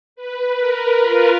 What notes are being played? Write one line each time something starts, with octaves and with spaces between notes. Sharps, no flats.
B4
A#4
F4